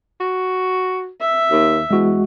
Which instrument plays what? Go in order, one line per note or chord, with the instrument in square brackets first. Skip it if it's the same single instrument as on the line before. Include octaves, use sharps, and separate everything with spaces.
[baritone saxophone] F#4
[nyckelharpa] E5
[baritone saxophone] D#2
[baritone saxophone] E2 [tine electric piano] G#3 F#4